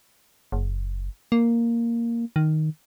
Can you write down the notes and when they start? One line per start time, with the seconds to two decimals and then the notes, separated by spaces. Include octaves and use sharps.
0.52 F#1
1.32 A#3
2.36 D#3